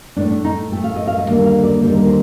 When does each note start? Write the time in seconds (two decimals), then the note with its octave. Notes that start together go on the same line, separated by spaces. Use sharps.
0.16 A2 A3 D4
0.31 D4
0.45 D#4
0.71 A2 A3 G5
0.84 F5
0.96 D#5
1.07 F5
1.18 D#5
1.27 D#2 D3 G3 A#3 F5
1.45 F5
1.64 D5
1.82 D#2 D3 G3 A#3 C5
1.95 A#4
2.07 C5